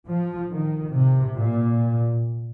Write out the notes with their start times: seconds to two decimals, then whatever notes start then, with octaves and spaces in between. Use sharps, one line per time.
0.08 F3
0.51 D#3
0.95 C3
1.38 A#2